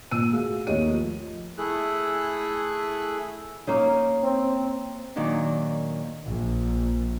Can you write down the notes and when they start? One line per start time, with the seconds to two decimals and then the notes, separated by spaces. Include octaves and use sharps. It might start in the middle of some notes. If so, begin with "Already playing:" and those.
0.11 A#2 E6 D#7
0.32 A3 F#4 G#4 F5
0.67 D#2 A3 A#4 C#5 D#5 D#7
0.91 F3
1.58 A3 E4 G#4 A4 F#6
3.67 A#3 C#4 D#4
4.24 C4
5.16 A#2 D#3 F#3 D4 D#4
6.25 A#1